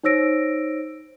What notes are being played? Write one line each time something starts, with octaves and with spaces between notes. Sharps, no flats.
D#4 C5 C#5 E6 A#6 D7